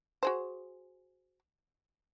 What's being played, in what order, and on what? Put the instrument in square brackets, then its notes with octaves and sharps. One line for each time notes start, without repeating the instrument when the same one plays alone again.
[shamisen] F#4 G#4 C5